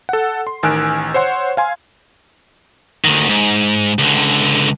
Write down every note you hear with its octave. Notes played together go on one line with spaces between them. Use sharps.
A4 F#5
C6
A1 D#3 G#5 E6 F#6 D7
C5 C#5 F#5 C6
F5 G#5 C6
D2 D#3
G#2
C#2 D3